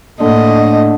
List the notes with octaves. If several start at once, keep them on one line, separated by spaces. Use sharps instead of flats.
A2 D3 A3 A#3 D#5